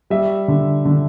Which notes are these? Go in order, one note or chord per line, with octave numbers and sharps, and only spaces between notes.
G3 E5
D3
D3